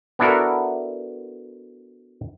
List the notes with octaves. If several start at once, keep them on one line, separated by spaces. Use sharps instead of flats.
B3 D4 E4 F#4 A4 A#4